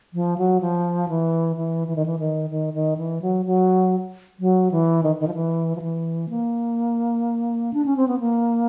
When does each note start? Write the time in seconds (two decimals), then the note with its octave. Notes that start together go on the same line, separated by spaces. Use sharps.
0.14 F3
0.38 F#3
0.61 F3
1.09 E3
1.56 E3
1.88 E3
1.96 D#3
2.06 E3
2.19 D#3
2.50 D#3
2.74 D#3
2.97 E3
3.22 F#3
3.46 F#3
4.39 F#3
4.71 E3
5.03 D#3
5.20 D#3
5.27 F3
5.34 E3
5.76 F3
5.82 E3
6.30 A#3
7.73 D4
7.86 C#4
7.97 C4
8.08 B3
8.20 A#3